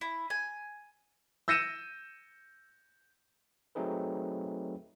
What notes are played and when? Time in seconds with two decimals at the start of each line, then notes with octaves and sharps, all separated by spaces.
0.01 E4
0.30 G#5
1.48 E6 G6 A#6 C#7 D#7 E7
3.75 F#3 A3 C4 D#4 G#4 B4